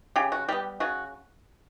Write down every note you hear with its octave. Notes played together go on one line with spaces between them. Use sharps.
C#3 G4
F#4
G3 B3 G4
C#3 F#4